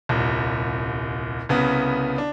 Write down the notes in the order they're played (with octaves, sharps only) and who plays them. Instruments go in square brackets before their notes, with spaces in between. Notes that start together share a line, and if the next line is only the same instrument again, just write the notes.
[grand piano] D#1 C2
C2 C#3 B3
D4